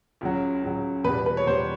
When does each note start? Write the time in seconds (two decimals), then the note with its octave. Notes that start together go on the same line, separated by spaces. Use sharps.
0.21 C#2 C#3 F#3
0.62 C#2 C#3 F#3
1.04 E2 B2 G3 B4
1.26 B4
1.37 C#5
1.47 E2 B2 G3 C5